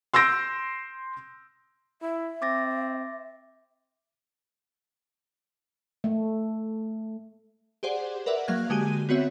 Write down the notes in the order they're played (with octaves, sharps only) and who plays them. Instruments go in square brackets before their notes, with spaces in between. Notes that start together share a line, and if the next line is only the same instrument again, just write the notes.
[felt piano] C6 E6 G6 A#6 D7
[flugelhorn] E4 [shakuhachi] E5
[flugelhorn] C4 [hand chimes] D6 A6 A#6
[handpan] A3
[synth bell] G4 G#4 C5 D5 F#5
A#4 B4 D5 E5 F#5
F#3 A#3 F5 F#6 G#6
D3 G#3 F#4 G4 G#5 D#7
B3 C4 F#4 C#5 E5